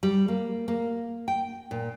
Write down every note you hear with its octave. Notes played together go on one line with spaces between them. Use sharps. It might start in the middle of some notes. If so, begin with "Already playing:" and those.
G3
A#3
A#3
G5
A#2